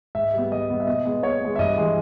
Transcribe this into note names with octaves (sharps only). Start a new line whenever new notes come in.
G#2 E5
G3 B3
G#2 D#5
G3 B3
E5
B2 D#5
G#3 B3
B2 C#5
G#3 B3
E5
G2 D#5
E3 G#3